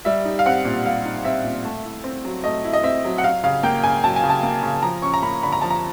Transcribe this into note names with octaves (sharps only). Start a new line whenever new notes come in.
G3 E5
D#4
F5
C4 F#5
A#2
G3 F5
D#4
C4 E5
A#2
A3
E4
C4
F#3
A3 D#5
E4
D#5
C4 E5
F#3
F#5
F#3 F5
C#3 F5
A#3 G5
C#3 G#5
F#3 A5
G#5
C#3
A5
A#3
C#3
F3 A#5
C#4 C#6
A#5
A#3 B5
D3 B5
A#5
F3 A5
A#5